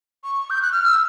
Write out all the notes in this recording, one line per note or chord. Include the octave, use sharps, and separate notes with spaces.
C#6
G6
F#6
F6
E6